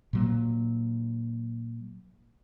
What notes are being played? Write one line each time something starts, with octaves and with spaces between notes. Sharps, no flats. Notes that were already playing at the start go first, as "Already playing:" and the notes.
A#2 F#3 A#3